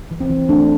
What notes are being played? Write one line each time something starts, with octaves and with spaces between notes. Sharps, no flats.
E3
C4
E3
A3 D4